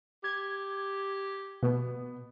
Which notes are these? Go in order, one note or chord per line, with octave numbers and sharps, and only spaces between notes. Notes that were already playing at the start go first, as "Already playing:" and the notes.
G4 G#6
B2 B3